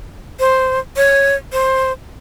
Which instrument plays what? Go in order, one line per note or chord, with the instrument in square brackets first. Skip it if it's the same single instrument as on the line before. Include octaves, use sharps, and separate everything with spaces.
[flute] C5
C#5
C5